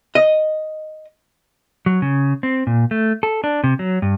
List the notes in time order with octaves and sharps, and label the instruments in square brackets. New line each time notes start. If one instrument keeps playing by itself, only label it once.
[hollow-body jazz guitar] D#5
[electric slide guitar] F#3
C#3
C4
A#2
A3
A4
D4
C3
F#3
G2